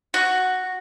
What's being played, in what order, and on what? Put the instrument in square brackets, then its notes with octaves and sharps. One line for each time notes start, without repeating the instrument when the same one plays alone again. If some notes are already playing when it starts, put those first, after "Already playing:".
[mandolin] F#4